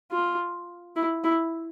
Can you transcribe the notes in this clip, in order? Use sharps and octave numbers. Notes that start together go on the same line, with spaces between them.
F4
E4
E4